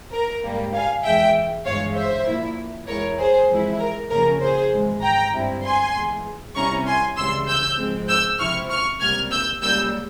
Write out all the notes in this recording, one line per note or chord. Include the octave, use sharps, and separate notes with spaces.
A#4
G#2 G3 A#3
F5 G#5
E2 E3 G#3 E5 G5
G1 G2 E3 G#3 C#5 F5
C5 E5
A#2 F3 A#3 E4
E2 E3 G#3 E4 A#4 C#5
G#4 C5
F2 E3 G#3 E4
A#4
F2 C#3 F3 A#3 C#4 A#4
G#4 C5
G#1 G#2 E3 G#3
G5 A#5
G1 G2 G3 C4 E4
G#5 C6
E2 E3 G#3
C2 C3 G3 C#4 E4 A#5 C#6
G#5 C6
C#2 C#3 E3 G3 C6 E6
E6 G6
G#2 F3 G#3 C4
E6 G6
C#2 C3 F3 C4 E4 C#6 F6
C#6 F6
C#2 C3 G3 A#3 F6 G#6
E6 G6
C#2 C#3 G3 A#3 E6 G6